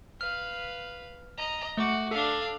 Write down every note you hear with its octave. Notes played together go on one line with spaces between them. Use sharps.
B4 F5 F6
D#5 A#5
A3 F#4 D6
D4 A4 F5